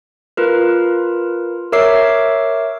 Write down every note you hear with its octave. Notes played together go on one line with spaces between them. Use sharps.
F4 A#4 B4
A#4 C#5 E5 D6 E6 C7